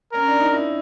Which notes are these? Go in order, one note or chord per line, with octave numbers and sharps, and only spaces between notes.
C#4 A#4
D4
D#4
E4